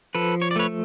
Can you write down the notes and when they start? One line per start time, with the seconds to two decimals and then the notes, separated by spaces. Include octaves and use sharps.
0.15 F3 A4 B4
0.42 C#5
0.51 D5
0.56 A3 B4 C#5